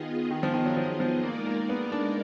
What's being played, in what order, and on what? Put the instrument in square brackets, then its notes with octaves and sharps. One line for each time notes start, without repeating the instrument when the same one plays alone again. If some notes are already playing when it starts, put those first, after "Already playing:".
Already playing: [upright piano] D#3 [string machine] B3 F4 G#4 D#5
[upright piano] D#3
F3
D#3
F#3
F3
F3
[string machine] G#3 D#4 A#4 D5 [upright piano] A#3
[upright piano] A#3
B3
D4